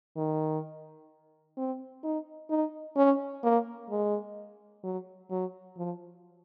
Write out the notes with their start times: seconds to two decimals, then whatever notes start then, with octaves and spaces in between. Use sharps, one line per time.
0.16 D#3
1.57 C4
2.04 D#4
2.50 D#4
2.97 C#4
3.44 A#3
3.90 G#3
4.83 F#3
5.31 F#3
5.77 F3